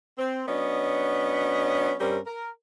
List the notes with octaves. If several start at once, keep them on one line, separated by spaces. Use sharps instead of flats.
C4
F#3 B3 C#4 D4 D#5
G2 G3 C4 C#4 A#4
A#4